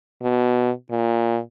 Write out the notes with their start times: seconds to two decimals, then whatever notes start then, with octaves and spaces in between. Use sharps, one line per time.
0.22 B2
0.90 A#2